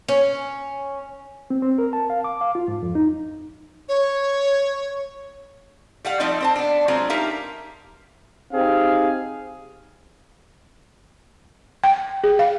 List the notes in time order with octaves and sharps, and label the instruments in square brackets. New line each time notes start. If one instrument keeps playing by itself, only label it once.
[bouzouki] C#4
[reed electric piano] C4
C4
A#4
A5
F5
D6
F5
F4
G#2
F2
D#4
[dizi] C#5
[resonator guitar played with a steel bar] G3 F5 F#5
F3 A3 C4 D#4 D5 D#5
C4 C5 A5
B3 D4
F#3 G#3 C4 F4 A#5
D#4 G4 A#4 E5 F5
[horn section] C4 D#4 G4 G#4 F5
[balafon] G5
G#4
F5